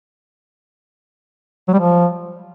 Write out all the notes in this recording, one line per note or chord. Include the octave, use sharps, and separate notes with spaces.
F#3
G3
F3